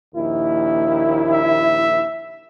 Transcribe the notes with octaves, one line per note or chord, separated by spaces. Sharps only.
A#1 D#2 E4
E5